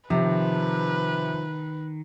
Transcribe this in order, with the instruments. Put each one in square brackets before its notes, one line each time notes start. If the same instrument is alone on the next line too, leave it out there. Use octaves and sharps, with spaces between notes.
[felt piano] C3 [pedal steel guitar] D#3 [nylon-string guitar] F3 [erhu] B4